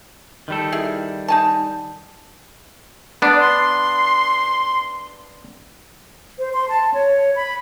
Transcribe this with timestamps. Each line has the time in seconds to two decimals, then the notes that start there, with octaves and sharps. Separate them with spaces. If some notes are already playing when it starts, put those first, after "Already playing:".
0.48 D#3 G3 A4
0.72 E4 G#4
1.28 D#4 G#5 A5
3.22 B3 D4 D5
3.40 C6
6.39 C5
6.53 C6
6.69 A5
6.94 C#5
7.36 B5